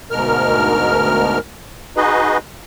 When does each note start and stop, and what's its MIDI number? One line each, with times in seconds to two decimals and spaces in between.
0.11 1.39 38
0.11 1.39 44
0.11 1.39 47
0.11 1.39 70
0.11 1.39 89
1.96 2.38 63
1.96 2.38 66
1.96 2.38 68
1.96 2.38 71
1.96 2.38 75